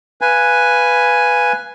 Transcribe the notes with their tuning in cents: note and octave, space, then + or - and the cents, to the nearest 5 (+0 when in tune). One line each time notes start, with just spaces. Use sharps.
B4 +0 F5 -15 G#5 +0